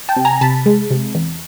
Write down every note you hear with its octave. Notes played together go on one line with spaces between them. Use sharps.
G5 A5
C3
G#5 A#5
C3 A5 B5
G#3
C3
E2